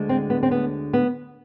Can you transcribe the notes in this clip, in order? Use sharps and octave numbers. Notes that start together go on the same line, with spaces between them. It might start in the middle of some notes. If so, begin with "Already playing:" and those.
Already playing: D2 D3 G#3
C4
B3
C4
B3
B3